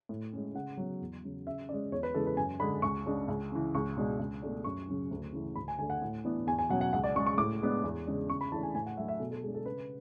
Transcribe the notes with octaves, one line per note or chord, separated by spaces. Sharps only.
A2
G#3 C#4
C#3 F#5
F#3 B3
E2
C#3 F#3
C#3 E5
G#3 C#4 D5
E2 C#5
B4
C#3 E3 G#3 A4
B4
F#2 G#5
D3 G#3 B5
C#2 C#6
C#3 G#3 D4
C#2
C#3 E3
C#2 C#6
B2 G#3 D4
C#2
B2 A3 D4
F#2 C#6
C#3 F#3 C#4
D2
C#3 E3 A3
D2 B5
G#5
D3 A3 D4 G#5
F#5
A2
E3 B3 D4
E2 G#5
G#5
B2 F#3 C#4 F#5
F#5
C#2 F#5
D5
C#3 G#3 C#6
C#6
A2 D6
G#3 B3 D4
E2
C#3 G#3 D4
C#3 C#6
B5
E3 A3 D4 A5
G#5
A2 G#5
F#5
F#3 A3 D4 E5
E5
B2 A4
A4
G#3 D4 G#4
A4
C#3 B4